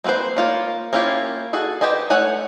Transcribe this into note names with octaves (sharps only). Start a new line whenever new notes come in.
A#3 C4 F#4 B4 C5
A#3 F4 C#5
A#3 C#4 E4 F4 G4
F#4 G#4 A4
G4 B4 C5 D#5 G#5
A3 C#5 F#5 G#5